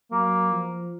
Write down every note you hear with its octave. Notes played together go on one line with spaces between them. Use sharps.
F#3 A#3
F3